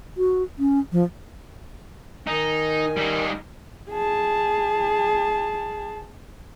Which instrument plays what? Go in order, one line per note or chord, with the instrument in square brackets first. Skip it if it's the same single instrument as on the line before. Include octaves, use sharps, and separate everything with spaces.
[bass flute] F#4
C#4
F3
[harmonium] D#3 G#5 [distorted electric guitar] D#4
[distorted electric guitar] G3 D#4
[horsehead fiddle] G#4 A5